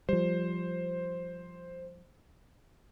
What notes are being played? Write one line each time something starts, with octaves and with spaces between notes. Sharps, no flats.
F3 G3 C5